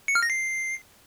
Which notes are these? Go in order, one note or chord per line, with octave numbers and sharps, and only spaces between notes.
C#7
F6
A#6
C7